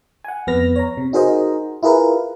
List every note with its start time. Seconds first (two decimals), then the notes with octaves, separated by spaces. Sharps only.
0.24 F#5 G#5
0.47 F2 B3 B4 F6 A#6
0.76 C#5 A#5
0.97 C3
1.13 D#4 F#4 G#4 A#4 C5 D#5
1.83 E4 F4 G#4 A#4 B4